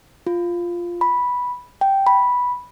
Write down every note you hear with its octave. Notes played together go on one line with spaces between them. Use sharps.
F4
B5
G5
B5